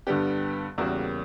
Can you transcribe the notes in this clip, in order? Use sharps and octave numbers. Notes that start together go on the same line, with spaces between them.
G2 D3 G3 B3 G4
E2 C#3 G3 A#3 F#4 A#4